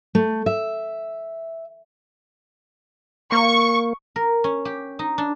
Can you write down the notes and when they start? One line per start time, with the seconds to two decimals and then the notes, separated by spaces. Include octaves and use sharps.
0.15 A3
0.46 E5
3.32 A#3 C#6
4.16 A#4
4.44 C#4
4.65 G4
4.99 D#4
5.18 D4